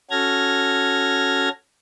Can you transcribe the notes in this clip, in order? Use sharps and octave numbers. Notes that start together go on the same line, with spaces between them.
C#4 F#4 A4 F6 G#6 A#6